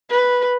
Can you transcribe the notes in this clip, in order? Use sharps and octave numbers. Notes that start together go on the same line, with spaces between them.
B4